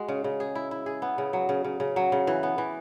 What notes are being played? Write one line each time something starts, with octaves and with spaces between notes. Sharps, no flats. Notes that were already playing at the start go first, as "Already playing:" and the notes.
Already playing: G#3 F#4
C#3
C#3
G#4
E4
E4
G#4
B3
C#3
F#3
C#3
C#3
C#3
F#3
C#3
E3
B3
E3